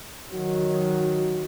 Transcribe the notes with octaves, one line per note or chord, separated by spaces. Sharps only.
D#3 F#3 F#4